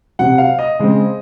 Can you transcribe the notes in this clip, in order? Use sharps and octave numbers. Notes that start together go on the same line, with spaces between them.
C3 F#3 C4 F#5
F5
D#5
C#3 G#3 C4